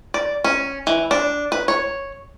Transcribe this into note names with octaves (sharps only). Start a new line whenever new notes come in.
D5
C#4
E3
D4
B4
C#5